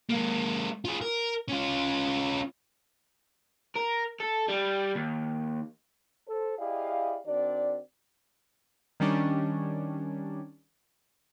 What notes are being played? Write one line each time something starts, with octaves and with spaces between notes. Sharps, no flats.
G#3 A#3
F4 G#4
A#4
C#4 F4
A#4
A4
G3
D#2
A4 C5
E4 G4 G#4 D5 D#5 F5
D#3 C4 D4 F#4 D5
D#3 G3 C#4 D4